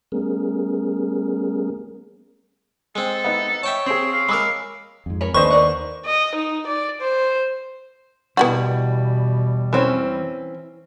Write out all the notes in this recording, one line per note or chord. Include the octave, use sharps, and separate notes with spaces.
G3 A3 B3 C#4 G#4 A#4
G#3 C4 A4
B3 D#4
C#5 E5 G5 A5
C4 G#4 C6
F5
G#3 A#4 B5 D6 E6
F2 G#2
A#4 C#5 B5
D#2 A3 D4 B4 C5 D#5 C#6
A#4 D5 F#5
D#5
D#4
D5
C5
E2 B2 G3 B3 E4 F#4
E3 C4 C#4